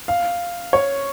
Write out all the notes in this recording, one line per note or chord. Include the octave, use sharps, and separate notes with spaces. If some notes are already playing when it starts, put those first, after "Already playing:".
F5
C#5